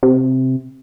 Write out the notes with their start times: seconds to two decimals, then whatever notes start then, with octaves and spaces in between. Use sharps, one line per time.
0.03 C3